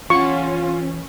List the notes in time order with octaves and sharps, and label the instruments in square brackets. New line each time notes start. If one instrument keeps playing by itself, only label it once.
[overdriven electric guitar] E3 F#5 [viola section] C#4 [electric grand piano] F4 [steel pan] C#6